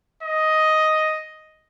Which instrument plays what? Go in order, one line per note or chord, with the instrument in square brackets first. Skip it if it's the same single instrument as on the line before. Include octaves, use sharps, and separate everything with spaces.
[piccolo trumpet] D#5